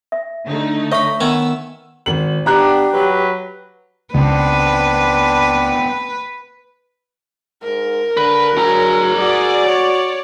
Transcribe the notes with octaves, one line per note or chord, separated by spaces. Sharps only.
E5
D3 A3 D#4
C#5 D#5 E5 B5 C#6
D#3 B3 G#5 E6
G#1 F#7
B3 D4 G4 A#5 F#6
F#3 B4
C#2 B3 C4 D4 B4
G#2 A#4
D3 B4
D3 F#3 G#4 A#5
F#4 D5
C#5